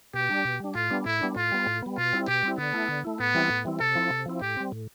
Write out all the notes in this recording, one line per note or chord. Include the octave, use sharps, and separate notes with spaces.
B2 G4
G3 D4
B2
G3 D4
A2 F4
G3 B3 D4
A2 E4
G3 B3 D4
A2 F4
G3 B3
A2
G3 B3
B2 F4
G3 C4 E4
B2 G4
G3 C4 E4
D3 B3
A3 E4
D3
A3 E4
A2 B3
E3 G3 C4 E4
A2
E3 G3 C4 E4
C3 A4
F3 C4 E4
C3
F3 C4 E4
A2 G4
G3 C4
A2